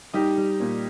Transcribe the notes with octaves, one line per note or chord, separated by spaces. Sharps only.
G3 D#4 G4
G3
A#2